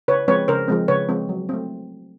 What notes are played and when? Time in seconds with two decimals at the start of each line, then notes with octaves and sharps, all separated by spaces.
0.08 C#3 B4 C#5
0.28 F3 G#3 C4 B4 C#5
0.48 C#3 A#4 C5
0.68 F3 G#3 C4
0.88 C#3 B4 C#5
1.09 F3 G#3 C4
1.29 F#3
1.49 A3 C4